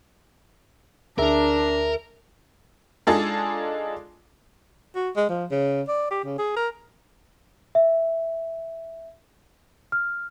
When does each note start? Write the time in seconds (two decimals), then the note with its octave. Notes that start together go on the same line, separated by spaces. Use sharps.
1.18 D2 D4 G#4 A#4 E5
3.07 G#3 D4 D#4 F4 G#4 A4
4.96 F#4
5.16 G#3
5.29 F3
5.51 C#3
5.88 D5
6.11 G4
6.25 C#3
6.39 G#4
6.56 A#4
7.75 E5
9.92 F6